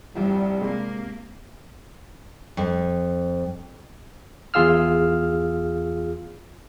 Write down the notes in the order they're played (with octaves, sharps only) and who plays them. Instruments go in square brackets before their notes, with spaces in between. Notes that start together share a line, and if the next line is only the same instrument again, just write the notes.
[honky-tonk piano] F1 C2 G2 [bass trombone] G3
[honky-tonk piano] C3 [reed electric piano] G#3 [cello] A#3
[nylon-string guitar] F2
[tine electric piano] E2 F4 G#4 F5 E6 F6